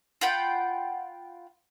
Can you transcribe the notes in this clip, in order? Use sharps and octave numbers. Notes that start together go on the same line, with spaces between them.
F4 F#5 G5 B5